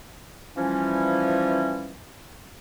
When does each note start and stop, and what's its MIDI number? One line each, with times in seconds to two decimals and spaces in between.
0.57 1.95 52
0.57 1.95 53
0.57 1.95 55
0.57 1.95 61